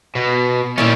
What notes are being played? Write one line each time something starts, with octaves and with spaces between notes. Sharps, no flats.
B2
A#2 D#3 C#4 E4 D5